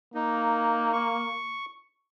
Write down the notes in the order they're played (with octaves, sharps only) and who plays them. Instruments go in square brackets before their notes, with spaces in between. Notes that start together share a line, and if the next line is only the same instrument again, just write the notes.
[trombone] A#3 [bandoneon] D#4
[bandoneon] C#6